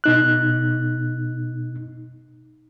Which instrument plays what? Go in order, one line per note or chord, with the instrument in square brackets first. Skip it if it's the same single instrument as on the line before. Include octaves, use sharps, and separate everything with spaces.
[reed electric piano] B2 D#4 F#6